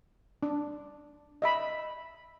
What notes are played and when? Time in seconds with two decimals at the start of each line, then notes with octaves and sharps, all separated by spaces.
0.43 D4
1.42 D#5 E5 B5